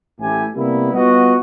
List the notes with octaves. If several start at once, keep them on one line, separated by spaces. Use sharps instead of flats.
A1 A2 A3 E4 G4 G#5
C3 G3 A#3 B3 E4
G3 B3 F4 F#4 D#5 F#5